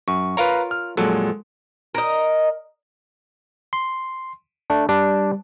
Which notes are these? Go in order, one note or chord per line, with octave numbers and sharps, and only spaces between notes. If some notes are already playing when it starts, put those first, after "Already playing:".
F#2 C#6
F4 A#4 B4 C#5 F5 A#5
F6
F2 A#2 F#3 G#3 A4
A#4 D#5
C6
A3 D4
G3 D4